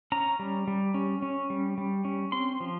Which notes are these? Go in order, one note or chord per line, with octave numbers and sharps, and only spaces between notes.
C#4 A#5
G3
G3
C#4
C#4
G3
G3
C#4
C4 C6
F3